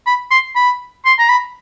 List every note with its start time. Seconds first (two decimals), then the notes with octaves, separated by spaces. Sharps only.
0.07 B5
0.31 C6
0.55 B5
1.05 C6
1.19 A#5
1.29 B5